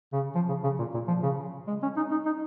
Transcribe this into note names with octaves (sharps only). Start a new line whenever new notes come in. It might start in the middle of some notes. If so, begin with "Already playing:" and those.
C#3
F3
C#3
C#3
A#2
A#2
F3
C#3
G#3
C#4
D#4
D#4
D#4